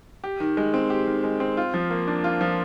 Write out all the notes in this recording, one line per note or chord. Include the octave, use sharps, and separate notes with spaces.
G4
D#3
G#3
C4
G4
D#3
G#3
C4
F4
F3
A#3
D4
F4
F3